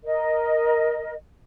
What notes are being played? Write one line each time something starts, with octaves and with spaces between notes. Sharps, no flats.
A#4 D#5